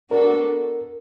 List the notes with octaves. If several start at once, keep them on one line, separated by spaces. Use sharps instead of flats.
B3 D4 F#4 A4 A#4